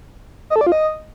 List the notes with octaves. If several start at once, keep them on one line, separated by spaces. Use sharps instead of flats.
D#5
A4
D5
F4
D#5